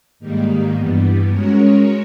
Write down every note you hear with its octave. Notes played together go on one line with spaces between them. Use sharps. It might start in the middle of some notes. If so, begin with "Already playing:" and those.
G#2 D#3 G3 A#3 D#4
G2 E3 G3 B3
G#3 C#4 F#4 A#4 C#5